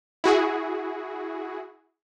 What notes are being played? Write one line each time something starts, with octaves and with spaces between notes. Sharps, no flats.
E4 F#4 G#4